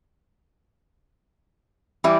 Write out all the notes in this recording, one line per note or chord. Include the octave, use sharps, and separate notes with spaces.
E3 G3 E4